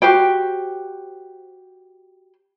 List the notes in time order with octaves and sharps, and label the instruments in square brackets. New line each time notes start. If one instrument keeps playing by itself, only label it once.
[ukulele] F#4 G4 C5 G5